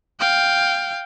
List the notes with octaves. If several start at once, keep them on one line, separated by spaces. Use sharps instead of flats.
F5 G5